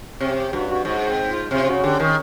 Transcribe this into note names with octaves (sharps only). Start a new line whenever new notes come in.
C3 G4
G4
G2 F#4
F#4
G#2 F#4
C4
F4
C3 F4
C#3 F#4
D3 G4
D#3 G#4